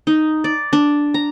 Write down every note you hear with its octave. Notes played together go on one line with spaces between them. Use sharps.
D#4
D5
D4
A#5